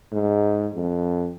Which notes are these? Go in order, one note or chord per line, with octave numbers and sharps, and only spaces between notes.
G#2
F2